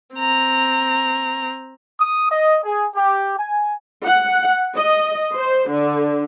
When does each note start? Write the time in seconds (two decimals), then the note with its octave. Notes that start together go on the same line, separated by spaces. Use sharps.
0.16 C4 A#5
1.99 D#6
2.29 D#5
2.64 G#4
2.95 G4
3.37 G#5
4.06 F#5
4.76 D#5
5.33 C5
5.69 D3